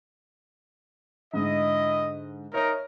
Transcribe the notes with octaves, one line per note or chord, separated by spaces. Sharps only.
G#2 D3 E4 D#5
D#4 A#4 C#5 E5